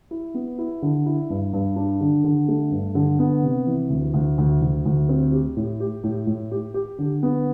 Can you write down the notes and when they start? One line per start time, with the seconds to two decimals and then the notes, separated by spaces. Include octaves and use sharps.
0.11 E4
0.34 B3
0.58 E4
0.82 D3
1.06 E4
1.30 G2
1.53 G2
1.76 D4
2.01 D3
2.24 D3
2.48 A3
2.71 G2
2.95 D3
3.19 B3
3.43 C3
3.66 E3
3.90 D2
4.14 D2
4.38 D2
4.62 D2
4.86 D2
5.09 C4
5.32 G4
5.57 A2
5.80 G4
6.04 A2
6.27 A2
6.52 G4
6.74 G4
6.99 D3
7.23 B3